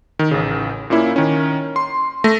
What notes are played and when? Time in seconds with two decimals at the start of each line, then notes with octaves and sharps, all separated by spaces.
0.19 D#3
0.31 A1 C#3
0.90 A#2 A#3 C#4 E4
1.16 D#3 C#4
1.76 C6
2.24 A3 A#6